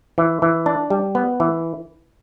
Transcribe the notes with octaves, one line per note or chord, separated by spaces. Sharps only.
E3
E3
D4
G3
B3
E3